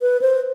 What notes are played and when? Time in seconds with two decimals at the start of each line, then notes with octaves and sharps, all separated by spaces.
0.02 B4
0.21 C5